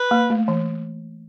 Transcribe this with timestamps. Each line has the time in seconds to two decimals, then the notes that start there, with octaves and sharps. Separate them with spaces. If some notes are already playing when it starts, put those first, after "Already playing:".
Already playing: B4
0.11 A#3
0.30 A3
0.48 E3